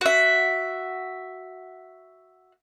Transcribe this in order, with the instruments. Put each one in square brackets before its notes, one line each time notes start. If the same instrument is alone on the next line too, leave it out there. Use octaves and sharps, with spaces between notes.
[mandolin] F#4 E5